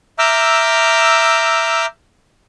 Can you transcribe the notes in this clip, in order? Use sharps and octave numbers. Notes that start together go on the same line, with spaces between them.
E5 A#5 D6 E6 F6 G6